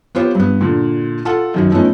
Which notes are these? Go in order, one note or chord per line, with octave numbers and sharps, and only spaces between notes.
B3 F4 G4 C5 C#5
G2 B3
A#2 D3
F4 A4 F#5
F#2 D#3 F#3
F3 A3 B3 C#4 D#4